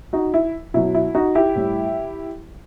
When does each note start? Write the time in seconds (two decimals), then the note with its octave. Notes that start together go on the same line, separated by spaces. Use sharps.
0.13 D#4 F#4
0.34 E4
0.74 B2 F#3 E4
0.94 E4
1.15 D#4 F#4
1.35 E4 G4
1.56 A2 G3